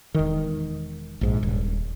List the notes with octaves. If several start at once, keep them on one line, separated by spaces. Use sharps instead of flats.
E1 D#3
A#1 G#2
D#1